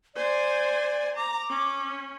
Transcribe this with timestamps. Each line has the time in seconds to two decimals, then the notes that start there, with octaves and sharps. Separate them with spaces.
0.15 C5 D5 G#5
1.16 A#5 D6
1.49 C#4